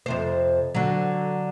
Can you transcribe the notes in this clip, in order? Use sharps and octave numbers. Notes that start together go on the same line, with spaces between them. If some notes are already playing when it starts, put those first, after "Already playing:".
F2 C3 C5
D3 F#3